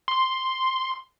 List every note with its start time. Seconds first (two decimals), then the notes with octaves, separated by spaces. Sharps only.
0.08 C6